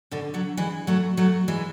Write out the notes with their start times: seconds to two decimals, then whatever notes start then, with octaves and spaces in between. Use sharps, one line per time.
0.11 B2 D3
0.34 D3 F#3
0.57 E3 G#3
0.87 F#3 A3
1.17 F#3 A3
1.48 E3 G#3